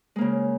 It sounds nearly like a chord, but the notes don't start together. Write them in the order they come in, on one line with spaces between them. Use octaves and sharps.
G#3 A#3 C#3